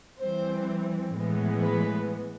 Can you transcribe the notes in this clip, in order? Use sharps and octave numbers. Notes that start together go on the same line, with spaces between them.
E3 G3 C4 C5
A2 E3 G#3 B3
B4